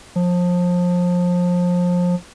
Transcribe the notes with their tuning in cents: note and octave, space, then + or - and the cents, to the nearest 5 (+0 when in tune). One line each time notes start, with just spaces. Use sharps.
F3 +25